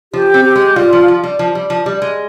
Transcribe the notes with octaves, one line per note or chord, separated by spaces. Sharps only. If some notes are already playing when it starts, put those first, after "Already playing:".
F3 G4
C4
G4
G#3
G3 F4
F3
F3
G3
F3
G3
F3
G3
G#3